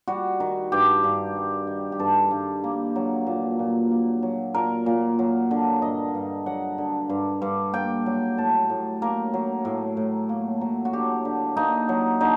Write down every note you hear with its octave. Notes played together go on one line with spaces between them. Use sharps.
G3 F#4
D#3
G2 G4
G2
G3
D#3
G4
G2 A4
G2
A#3
F#3
A#2
A#2
A#3
F#3
A#2 A#4
A#2
F#3
D3
G2 D#5
G2
F#3 F#5
D3
G2
G2
A#3 G5
F#3
A2 A5
A2
A#3 A#4
F#3
A2
A2
A#3
F#3
F#4
D3 G4
D3
A#3 D#4
F#3
D3 D#4